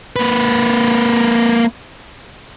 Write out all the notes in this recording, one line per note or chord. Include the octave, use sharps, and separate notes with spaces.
A#3 B4